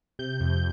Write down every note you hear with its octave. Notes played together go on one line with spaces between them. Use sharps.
C3 G6
F2